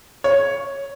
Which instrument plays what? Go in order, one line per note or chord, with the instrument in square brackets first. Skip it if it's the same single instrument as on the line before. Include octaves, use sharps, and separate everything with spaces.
[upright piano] C#5